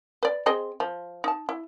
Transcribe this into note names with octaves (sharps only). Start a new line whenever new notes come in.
B4 D5
C4 G#4 D#5
F3
D#4 A5
E4